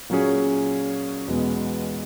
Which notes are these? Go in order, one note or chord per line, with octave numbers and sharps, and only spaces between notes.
A#2 F#3 C#4 G#4
E2 B2 G#3 B3